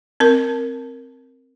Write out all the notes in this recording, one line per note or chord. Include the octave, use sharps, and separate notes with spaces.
C4 A#4